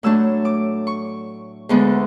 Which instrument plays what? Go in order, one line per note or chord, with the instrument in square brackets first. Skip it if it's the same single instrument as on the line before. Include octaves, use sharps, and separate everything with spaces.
[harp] A2 F#3 A3 D4 E6
D6
C#6
D2 D3 G#3 B3 D4